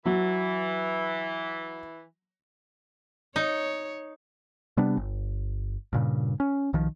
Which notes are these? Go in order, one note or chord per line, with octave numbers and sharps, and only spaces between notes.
E3 F#3
D#4 C#5
C3 G3 B3 D4
G1
G2 A#2 C#3
C#4
B1 D#3 F3